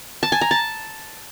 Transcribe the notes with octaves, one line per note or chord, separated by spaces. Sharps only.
A5
G#5
A#5
A5